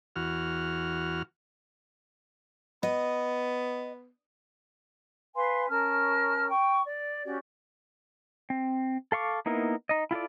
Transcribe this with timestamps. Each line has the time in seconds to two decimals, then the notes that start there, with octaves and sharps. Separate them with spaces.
0.16 E2 F#4 F6
2.83 B3 D#5
5.35 B4 F5 G#5 C6
5.69 C#4 A#4 A5 F6
6.49 G5 C#6
6.85 D5
7.24 C#4 F#4 G4 D5
8.50 C4
9.12 A4 F5 C#6 D6
9.46 A#3 B3 D#4 E4 A#4
9.89 D#4 D#5
10.11 E4 F4 A4 D5